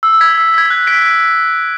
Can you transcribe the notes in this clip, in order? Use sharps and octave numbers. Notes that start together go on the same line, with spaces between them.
E6
G#6 B6
E6
G#6 B6
F#6
B6 D7